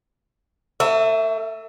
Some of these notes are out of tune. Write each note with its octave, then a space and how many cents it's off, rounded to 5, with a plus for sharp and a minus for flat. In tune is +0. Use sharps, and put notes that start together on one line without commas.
A3 +40 E5 +0